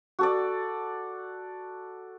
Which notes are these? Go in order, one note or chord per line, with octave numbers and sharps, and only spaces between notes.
F#4 A4 D5